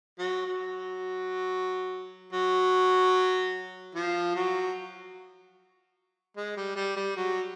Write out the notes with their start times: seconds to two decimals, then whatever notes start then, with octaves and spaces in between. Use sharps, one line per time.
0.19 F#3
0.46 F#3
2.33 F#3
3.95 F3
4.35 F#3
6.37 G#3
6.57 G3
6.76 G3
6.96 G3
7.16 F#3